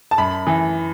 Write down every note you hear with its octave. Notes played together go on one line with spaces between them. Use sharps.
A5
F#2 B5
E3